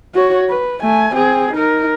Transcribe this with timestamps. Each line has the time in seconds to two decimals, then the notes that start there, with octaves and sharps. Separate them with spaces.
0.15 F#4 C#5
0.49 B4
0.81 A3 G#5
1.14 C4 G#4
1.54 D#4 A#4